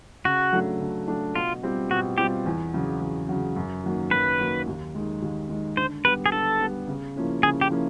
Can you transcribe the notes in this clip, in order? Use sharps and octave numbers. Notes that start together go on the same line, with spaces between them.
C#3 F#4
F#3 A3 D4
C#3
F#3 A3 D4
B2 F4
G3 C4 F4
B2 F#4
G3 C4 F4 G4
E2
C#3 F#3
E2
C#3 F#3
F#2
D#3 F#3 A#3
F#2 B4
D#3 F#3 A#3
D#2
D#3 G#3
D#2
D#3 G#3
D3 C5
G3 B3 B4
G#4
D3 A4
G3 B3
C#3
F3 A#3 C#4 E4
C#3 G#4
G4
F3 A#3 C#4 E4